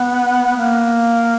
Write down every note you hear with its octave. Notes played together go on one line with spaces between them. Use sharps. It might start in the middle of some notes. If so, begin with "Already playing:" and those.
Already playing: B3
B3
A#3